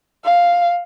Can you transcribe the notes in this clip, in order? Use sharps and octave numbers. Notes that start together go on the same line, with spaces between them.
F5